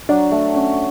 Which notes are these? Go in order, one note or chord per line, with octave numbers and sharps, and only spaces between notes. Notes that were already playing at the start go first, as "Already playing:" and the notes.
F#3 D4
A3
C#4